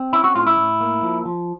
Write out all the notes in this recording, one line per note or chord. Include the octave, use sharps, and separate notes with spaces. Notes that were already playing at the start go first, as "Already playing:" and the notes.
Already playing: C4
C#4 E4
F#4
A2 F4
E4
A2
A#3
F3
F3